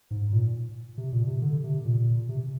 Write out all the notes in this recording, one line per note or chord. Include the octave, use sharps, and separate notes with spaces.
G#2
A#2
C3
A#2
C3
D3
C3
A#2
C3